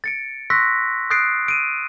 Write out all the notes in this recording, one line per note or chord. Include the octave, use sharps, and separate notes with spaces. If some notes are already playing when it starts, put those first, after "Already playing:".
A6 C#7 D7
C6 C#6 E6 F#6 A#6 B6
D#6 F#6 G6 A6 C7 D7
E6 D7 D#7